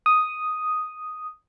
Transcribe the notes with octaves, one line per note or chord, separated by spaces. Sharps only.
D#6